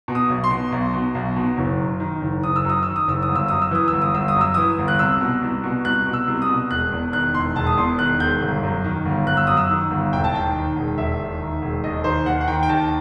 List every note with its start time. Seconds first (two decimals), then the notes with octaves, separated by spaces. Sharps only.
0.08 B2
0.15 D#6
0.29 B1
0.44 C6
0.51 B2
0.72 B1
0.93 B2
1.15 B1
1.36 B2
1.57 F#1
1.79 F#2
2.00 D#3
2.21 F#1
2.43 F#1 D#6
2.56 E6
2.65 F#2 D#6
2.83 D#3 E6
2.96 D#6
3.07 F#1 E6
3.23 D#6
3.28 G1
3.36 E6
3.48 F#2 D#6
3.62 E6
3.71 E3 D#6
3.88 G1 E6
4.01 D#6
4.13 G1 E6
4.28 D#6
4.36 F#2
4.41 E6
4.54 E3 D#6
4.78 G1
4.88 F#6
4.99 C2 E6
5.21 B2
5.42 C2
5.64 B2
5.85 C2 F#6
6.06 B2
6.13 E6
6.28 C2
6.42 D#6
6.49 B2
6.71 E1 F#6
6.92 E2
7.13 D#3 F#6
7.34 E1 C6
7.56 E1 A5
7.67 D#6
7.77 E2 C6
7.98 D#3 F#6
8.20 E1 G6
8.41 G1
8.63 F#2
8.84 D#3
9.05 G1
9.26 G1 F#6
9.37 E6
9.47 F#2 D#6
9.57 E6
9.70 D#3
9.91 G1
10.13 E1 G5
10.24 A5
10.34 D#2 G5
10.55 D#3
10.76 E1
10.98 E1 E5
11.20 D#2
11.41 D#3
11.62 E1
11.84 D#2 D#5
12.04 D#3 C5
12.26 D#2 F#5
12.41 F#5
12.48 D#3 G5
12.63 G5
12.69 D#2 A5